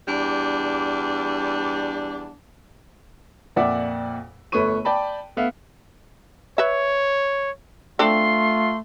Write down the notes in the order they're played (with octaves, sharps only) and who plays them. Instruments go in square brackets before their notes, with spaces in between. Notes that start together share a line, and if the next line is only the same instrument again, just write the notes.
[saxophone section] E2 G3 D4
[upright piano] F2 A#2 D5 E5 F#5 D6
G1 A3 B4 C#5 C#6 D#7
D5 G5 A5 B5
A3 B3 E5 F5
[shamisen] B4 E5 [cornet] C#5
[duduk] A3 [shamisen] C4 D4 A4 [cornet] F4 [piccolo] C6